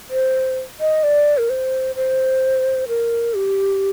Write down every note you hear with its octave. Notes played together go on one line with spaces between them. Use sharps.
C5
D#5
D5
A#4
C5
C5
A#4
G4